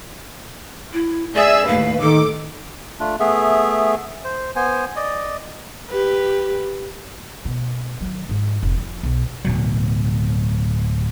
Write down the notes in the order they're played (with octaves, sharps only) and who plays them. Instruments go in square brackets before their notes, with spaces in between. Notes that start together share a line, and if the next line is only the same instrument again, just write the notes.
[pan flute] E4
[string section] G#4 E5 E6 [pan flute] D5
[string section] D#2 A2 B4 [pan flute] F5
[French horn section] D#3 [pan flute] A4 [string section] D6
[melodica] A3 D4 F4
A3 B3 G#4 E5
C5
B3 C5 G#5
D5 D#5
[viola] G4 B4
[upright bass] B2
D#3 F#3
G#2 F3
F1
F3
B1
[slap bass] D1 B2 F#3